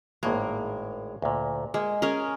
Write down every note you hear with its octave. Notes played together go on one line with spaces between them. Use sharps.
G#1 A2 G#3 A#3
D2 A#2
G#3 A#3
C#4 G#4 A#4